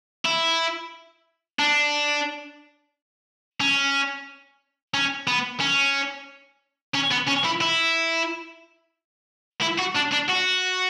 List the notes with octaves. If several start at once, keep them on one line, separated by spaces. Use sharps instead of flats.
E4
D4
C#4
C#4
B3
C#4
C#4
B3
C#4
E4
E4
E4
F#4
D4
D4
F#4